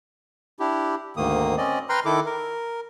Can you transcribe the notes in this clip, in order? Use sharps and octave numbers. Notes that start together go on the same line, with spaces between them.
D4 E4 G4
D2 G#2 D#3 A#3 D#6
C4 C#4 D5 D#5
B4 G5 A#5 C6 F6
D#3 E4 A4 D6
A#4